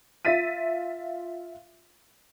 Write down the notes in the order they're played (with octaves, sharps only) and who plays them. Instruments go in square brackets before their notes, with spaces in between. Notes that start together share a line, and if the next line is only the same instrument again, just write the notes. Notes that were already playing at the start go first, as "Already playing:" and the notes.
[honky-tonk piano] F4 E5 A6 B6 D#7